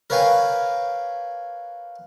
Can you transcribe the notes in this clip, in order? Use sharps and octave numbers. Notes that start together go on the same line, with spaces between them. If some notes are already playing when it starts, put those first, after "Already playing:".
A#4 B4 C#5 F5 G5 G#5